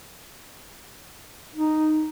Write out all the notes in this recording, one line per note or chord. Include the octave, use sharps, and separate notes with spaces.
D#4